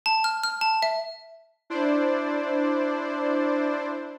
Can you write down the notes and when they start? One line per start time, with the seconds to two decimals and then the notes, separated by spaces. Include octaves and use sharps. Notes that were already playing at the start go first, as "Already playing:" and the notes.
0.06 A5
0.24 F6
0.44 F6
0.61 A5
0.82 E5
1.70 D4 E4 C5 D5